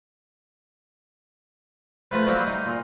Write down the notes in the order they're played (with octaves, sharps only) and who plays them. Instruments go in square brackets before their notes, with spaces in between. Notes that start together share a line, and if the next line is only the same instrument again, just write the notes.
[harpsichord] F3 A3 B3 B4
F#3 G3 A#3 C4 E4 F#4
D#4
A#2